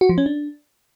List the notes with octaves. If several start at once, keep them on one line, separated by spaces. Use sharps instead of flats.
F#4
F3
C#4
D4